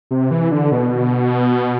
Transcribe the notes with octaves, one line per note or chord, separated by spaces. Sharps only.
C3
E3
D3
B2